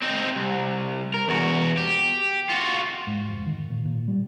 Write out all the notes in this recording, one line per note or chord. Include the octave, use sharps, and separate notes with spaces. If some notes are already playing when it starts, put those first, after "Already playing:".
C4 D#4
C2
A#4
E2 F#4
G4
F4 F#4
G#2
F1
D#3
A#2
A#2
G3